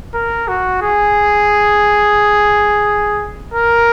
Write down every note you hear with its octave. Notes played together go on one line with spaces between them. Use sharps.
A#4
F#4
G#4
A#4